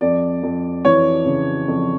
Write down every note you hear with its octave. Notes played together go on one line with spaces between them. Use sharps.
F2 D5
F2
E3 C#5
C#3
F2